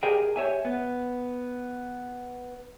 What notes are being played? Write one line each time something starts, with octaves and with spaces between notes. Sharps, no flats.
G4 G#4 A#4 D#5 G5
G4 C#5 E5 G#5
B3